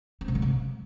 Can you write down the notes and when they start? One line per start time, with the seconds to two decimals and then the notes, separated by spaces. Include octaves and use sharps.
0.21 C4
0.28 C3
0.35 F#3
0.42 C3